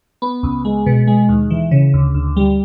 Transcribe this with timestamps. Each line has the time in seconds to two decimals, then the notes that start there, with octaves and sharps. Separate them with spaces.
0.22 B3
0.43 C#2
0.65 G#3
0.86 B2
1.07 G#3
1.29 D#2
1.50 E3
1.71 C#3
1.94 D2
2.14 D2
2.37 G3